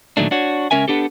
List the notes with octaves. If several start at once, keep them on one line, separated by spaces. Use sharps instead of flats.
A#2 D#3 F#3 A3 D4
D4 F#4 C#5
C#2 C#4 A#4 E5 G#5
B3 D4 G4 A4